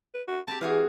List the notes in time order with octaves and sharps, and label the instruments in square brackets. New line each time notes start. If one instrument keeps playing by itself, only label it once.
[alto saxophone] B4
F#4
[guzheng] C4 G4 [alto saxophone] A5
[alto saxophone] E3 [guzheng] F#4 G#4 F5